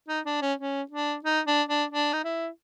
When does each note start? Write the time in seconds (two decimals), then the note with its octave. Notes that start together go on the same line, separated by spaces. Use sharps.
0.08 D#4
0.25 D4
0.42 C#4
0.59 C#4
0.91 D4
1.25 D#4
1.47 D4
1.69 D4
1.91 D4
2.13 D#4
2.24 E4